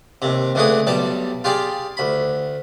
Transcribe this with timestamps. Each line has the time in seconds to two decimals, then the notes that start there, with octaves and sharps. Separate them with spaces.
0.22 D#2 C3
0.55 C#2 D3 E3 A3 G#4 D#6
0.87 B1 G3 D5 A5
1.44 F4 G4 G#4 D5
1.97 D2 B5